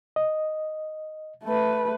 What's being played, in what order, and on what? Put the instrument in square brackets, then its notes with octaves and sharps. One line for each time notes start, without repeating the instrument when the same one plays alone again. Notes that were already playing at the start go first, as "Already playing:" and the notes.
[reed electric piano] D#5
[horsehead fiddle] A3 B4